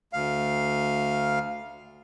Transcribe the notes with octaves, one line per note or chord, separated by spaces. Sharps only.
D2 F5